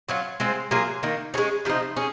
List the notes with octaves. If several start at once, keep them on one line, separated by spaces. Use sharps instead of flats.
F#3 C#4 F4
G#3 C4 F4 C5
F#3 A#3 F4 G#4
D#3 A#3 D#4
G#3 C#4 G#4 C#5
C3 F3 C4 D#4
C#4 G#4